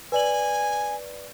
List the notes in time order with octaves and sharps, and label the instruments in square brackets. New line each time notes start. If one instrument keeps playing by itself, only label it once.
[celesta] B4 D5 F#7 [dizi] G#5